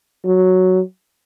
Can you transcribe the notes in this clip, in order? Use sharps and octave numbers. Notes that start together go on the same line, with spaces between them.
F#3